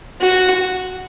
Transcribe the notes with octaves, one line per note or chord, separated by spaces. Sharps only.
F#4